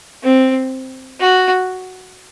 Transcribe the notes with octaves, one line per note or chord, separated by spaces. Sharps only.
C4
F#4